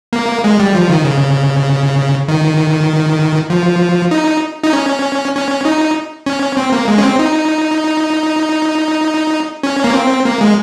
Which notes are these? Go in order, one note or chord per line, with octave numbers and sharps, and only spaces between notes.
A#3
G#3
G3
F3
D#3
C#3
D#3
F3
D#4
D#4
C#4
C#4
D#4
C#4
C4
A#3
G#3
C#4
C4
D#4
C#4
A#3
C4
A#3
G#3